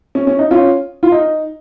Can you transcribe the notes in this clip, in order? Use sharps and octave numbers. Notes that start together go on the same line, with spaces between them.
C#4
C#4
D#4
C#4 F4
F4
D#4